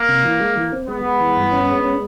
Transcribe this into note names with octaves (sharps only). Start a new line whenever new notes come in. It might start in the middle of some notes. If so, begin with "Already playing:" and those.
Already playing: A#3
C3
E3
G#3
E3
C4
G#3 B3
G#3
E3
G2
C#4
G#3
C#4